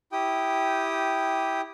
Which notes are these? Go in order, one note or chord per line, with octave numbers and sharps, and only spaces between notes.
E4 G4 G5 D#6